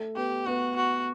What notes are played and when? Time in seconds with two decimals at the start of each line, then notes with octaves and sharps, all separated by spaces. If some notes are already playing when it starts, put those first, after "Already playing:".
Already playing: A3
0.16 B3 G4
0.46 B3 F#4
0.76 F#4